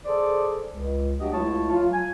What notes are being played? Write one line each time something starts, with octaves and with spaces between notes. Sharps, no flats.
G#4 A4 C5 D5
C#2
F#3 A3 D4 F#4 G4 D#5
C#2 A3 E4 F4 C#5 A5
F#3 F4
G#5